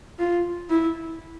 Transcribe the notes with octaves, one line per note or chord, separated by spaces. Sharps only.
F4
E4